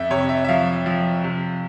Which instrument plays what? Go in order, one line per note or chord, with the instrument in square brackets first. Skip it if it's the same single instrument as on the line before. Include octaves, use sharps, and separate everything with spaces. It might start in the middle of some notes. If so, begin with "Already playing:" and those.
Already playing: [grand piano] F2 E5
C3 C#5
E5
E5
F3 F5
F3
C3